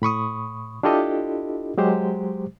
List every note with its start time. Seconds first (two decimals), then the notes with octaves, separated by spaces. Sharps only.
0.02 A2 B5 C#6 D#6
0.83 D4 E4 F4 G4 A4 D#5
1.78 F#3 G#3 G4 C5